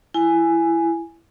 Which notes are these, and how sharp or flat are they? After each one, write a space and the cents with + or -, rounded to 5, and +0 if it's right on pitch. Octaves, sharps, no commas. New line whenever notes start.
E4 +20 G#5 +0